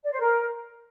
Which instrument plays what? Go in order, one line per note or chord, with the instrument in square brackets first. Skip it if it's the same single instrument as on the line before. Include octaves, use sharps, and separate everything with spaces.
[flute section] D5
C5
A#4